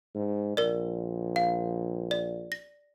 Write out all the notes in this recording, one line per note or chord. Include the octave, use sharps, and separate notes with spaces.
G#2
A#1 A#4 D5
F5
D5
A#6